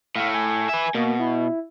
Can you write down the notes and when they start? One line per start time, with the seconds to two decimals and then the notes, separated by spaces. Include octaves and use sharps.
0.16 A2 A3 F5
0.34 G#5
0.69 B4 E5
0.95 B2 A#3
1.20 E4